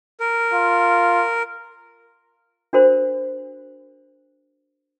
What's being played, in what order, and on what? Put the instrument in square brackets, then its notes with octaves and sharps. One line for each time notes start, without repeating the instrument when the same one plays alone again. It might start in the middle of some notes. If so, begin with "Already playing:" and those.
[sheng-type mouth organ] A#4
[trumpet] F4
[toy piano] D4 F#4 A#4 C5